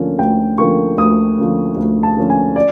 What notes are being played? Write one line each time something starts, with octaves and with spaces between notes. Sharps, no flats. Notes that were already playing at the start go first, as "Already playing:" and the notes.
Already playing: D2 D3 F3 A#3 C#4
D2 G5
D3 F3 A#3 C#4 C#6
D2 D#6
D3 F3 A#3 C#4
D2
A5
D3 F3 A#3 C#4
G#5
D5